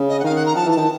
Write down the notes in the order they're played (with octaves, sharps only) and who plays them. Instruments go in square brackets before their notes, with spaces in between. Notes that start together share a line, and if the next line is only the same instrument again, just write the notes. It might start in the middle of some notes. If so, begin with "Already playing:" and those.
Already playing: [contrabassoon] C#3
[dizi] D#5
F#5
[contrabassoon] D#3 [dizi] F5
[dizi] F#5
A#5
[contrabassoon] F3 [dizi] A5
[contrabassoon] E3
[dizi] A5
[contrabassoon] D#3